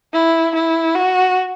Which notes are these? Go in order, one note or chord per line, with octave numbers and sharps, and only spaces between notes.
E4
E4
F#4